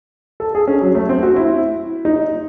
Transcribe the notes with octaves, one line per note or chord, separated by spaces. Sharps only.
A4
G#4
C#4
F#3
A3
C4
F#4
E4
D#4